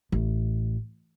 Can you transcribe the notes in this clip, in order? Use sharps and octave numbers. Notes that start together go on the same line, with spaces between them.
A1